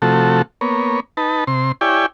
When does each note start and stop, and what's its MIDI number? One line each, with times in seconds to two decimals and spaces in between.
0.02 0.42 48
0.02 0.42 53
0.02 0.42 57
0.02 0.42 66
0.02 0.42 69
0.61 1.00 58
0.61 1.00 59
0.61 1.00 73
1.17 1.44 63
1.17 1.44 71
1.17 1.44 81
1.47 1.72 48
1.47 1.72 84
1.81 2.06 64
1.81 2.06 67
1.81 2.06 73
1.81 2.06 74
1.81 2.06 79
1.81 2.06 80